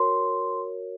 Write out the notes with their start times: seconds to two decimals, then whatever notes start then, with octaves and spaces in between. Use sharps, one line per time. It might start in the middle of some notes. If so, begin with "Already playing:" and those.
Already playing: F#4 A#4 C#5 C6